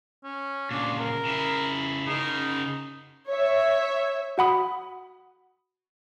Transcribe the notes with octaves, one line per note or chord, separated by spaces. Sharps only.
C#4
A#2 C#3 D4
A#4
C#3 E4
C#3 D#4 A#4
C#5 E5
F#4 F#5 B5 D#6